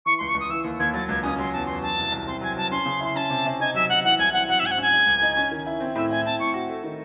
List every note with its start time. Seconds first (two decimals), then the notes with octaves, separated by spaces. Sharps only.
0.05 E3 C#6
0.17 C6
0.21 C#2
0.28 C#6
0.35 C#2 D#6
0.49 E3 E6
0.64 D#2
0.79 D#2 G#6
0.94 F#3 A6
1.09 C#2 G#6
1.23 C#4 D#6
1.38 F#3 C6
1.52 E2 A5
1.65 E2 C6
1.82 F#3 A5
1.97 C2
2.12 C2
2.26 C4 C6
2.41 F#3 G#5
2.56 F#3 A5
2.71 C#4 C6
2.86 C#3
3.00 E4 C6
3.15 C#4 A5
3.30 C3
3.45 C3
3.60 D#4 G#5
3.74 F#3 E5
3.89 F#3 F#5
4.04 E3 F#5
4.18 C2 G#5
4.33 C4 F#5
4.48 F#3 F#5
4.59 E5
4.63 G#2 G#5
4.71 F#5
4.78 C#4 G#5
4.92 G#3
5.06 C#2
5.22 D#4
5.37 C#4
5.51 D#3
5.66 E4
5.80 C4
5.95 A2 E5
6.10 E4 G#5
6.25 C4 A5
6.39 A2 C#6
6.54 F#4
6.69 A3
6.84 D#3